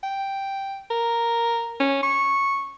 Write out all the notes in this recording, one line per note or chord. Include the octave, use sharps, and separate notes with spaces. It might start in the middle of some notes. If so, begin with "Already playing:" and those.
G5
A#4
C#4
C#6